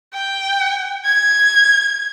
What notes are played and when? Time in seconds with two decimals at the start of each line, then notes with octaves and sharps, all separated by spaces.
0.14 G5
1.06 G#6